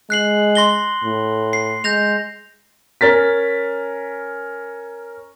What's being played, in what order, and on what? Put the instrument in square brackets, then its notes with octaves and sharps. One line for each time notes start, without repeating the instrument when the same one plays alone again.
[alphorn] G#3 [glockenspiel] F#6 C7 F#7
[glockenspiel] C6 A#6 G7
[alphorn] A2
[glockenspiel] C7
[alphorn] G#3 [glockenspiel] G6 A#6 F7
[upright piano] C#4 A#4 A6 B6